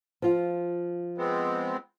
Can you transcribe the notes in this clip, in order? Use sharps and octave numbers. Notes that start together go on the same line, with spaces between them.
F3 F4
G#3 B3 C4